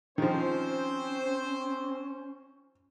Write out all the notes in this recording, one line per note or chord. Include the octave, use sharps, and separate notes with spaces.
D#3 F3 C4 C#4 C5